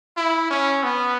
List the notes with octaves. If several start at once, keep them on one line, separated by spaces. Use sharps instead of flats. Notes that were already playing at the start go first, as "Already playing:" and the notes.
E4
C#4
B3